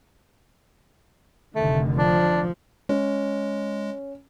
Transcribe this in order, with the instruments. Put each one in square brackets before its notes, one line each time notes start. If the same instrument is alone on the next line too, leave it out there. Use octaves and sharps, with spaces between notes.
[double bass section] F1 D3 D#3 [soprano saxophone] A3
[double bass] F3 [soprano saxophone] D4
[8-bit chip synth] G#3 [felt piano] C#4